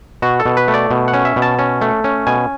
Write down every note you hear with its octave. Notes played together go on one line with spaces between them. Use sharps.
B2 F#4
A4
B2
B4
A3
D5
B2
F#5
C#4
E5
B2
A5
C#4
A3
C#4
B2 G#5